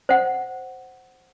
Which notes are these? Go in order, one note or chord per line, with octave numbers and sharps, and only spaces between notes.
C5 F#5